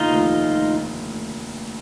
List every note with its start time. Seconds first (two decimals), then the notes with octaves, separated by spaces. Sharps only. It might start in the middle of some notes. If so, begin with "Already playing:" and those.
Already playing: F1 D#2 D3 F3 A3 D#4 F4
0.10 F1 D#2 D3 F3 A3